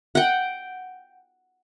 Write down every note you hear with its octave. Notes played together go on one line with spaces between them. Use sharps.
F#5 G5